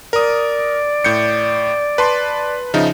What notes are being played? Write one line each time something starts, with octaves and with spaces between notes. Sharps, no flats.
A#4 D5 D#6
A2 G6 C#7
B4 A5 C6
C#3 F3 D#4 E5